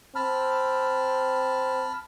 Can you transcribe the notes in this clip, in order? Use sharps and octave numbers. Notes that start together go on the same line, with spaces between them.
C4 A5 B5 F6